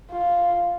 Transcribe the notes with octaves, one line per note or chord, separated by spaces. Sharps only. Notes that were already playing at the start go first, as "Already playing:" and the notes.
F4